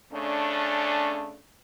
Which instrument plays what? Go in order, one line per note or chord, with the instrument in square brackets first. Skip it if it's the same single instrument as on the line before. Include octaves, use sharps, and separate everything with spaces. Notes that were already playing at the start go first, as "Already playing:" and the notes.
[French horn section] C#3 A3 C#4 D4